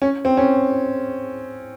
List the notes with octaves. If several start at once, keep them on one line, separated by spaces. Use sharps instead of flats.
C#4
C4
C#4